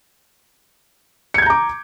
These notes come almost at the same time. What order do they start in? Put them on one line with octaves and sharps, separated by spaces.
C#7 G#6 G6 A#5 D6